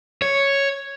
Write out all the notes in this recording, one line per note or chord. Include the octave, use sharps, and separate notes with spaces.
C#5